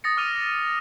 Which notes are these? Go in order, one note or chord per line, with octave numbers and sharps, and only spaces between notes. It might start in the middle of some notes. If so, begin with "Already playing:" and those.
D#6 A6 A#6 C#7
D6 F6 A6 D#7 F7